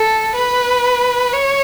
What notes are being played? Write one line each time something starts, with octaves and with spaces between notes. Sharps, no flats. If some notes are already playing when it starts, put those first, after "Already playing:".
Already playing: A4
B4
C#5